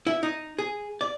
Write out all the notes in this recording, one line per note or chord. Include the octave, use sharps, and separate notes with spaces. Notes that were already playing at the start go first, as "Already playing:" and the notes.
E4
D#4
G#4
D5